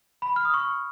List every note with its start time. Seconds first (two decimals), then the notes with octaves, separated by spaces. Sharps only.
0.22 B5
0.36 F6
0.45 D#6
0.54 C#6